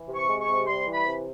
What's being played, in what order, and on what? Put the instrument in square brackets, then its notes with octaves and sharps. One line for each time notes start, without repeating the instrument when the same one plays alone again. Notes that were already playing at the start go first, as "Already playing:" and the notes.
Already playing: [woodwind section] E3
C3
C#6
G#3
C#6
C3
G3 C6
E3
B5
C3